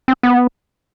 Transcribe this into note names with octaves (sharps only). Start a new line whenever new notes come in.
C4
B3